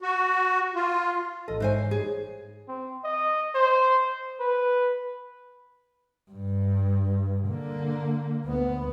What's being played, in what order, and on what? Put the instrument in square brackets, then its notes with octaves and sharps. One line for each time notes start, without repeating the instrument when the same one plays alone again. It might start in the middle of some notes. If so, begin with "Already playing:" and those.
[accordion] F#4
F4
[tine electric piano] A1 A4 [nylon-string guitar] D#5
[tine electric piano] G#2 C#5 [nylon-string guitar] E3 C5 G#5
[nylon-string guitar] G#4
[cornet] C4
D#5
C5
B4
[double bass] G2
D3 A#3
D2 B3